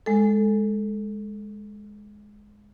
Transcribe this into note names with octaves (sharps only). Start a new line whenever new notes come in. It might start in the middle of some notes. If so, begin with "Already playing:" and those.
G#3 A4